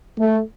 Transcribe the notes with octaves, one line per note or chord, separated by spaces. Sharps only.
A3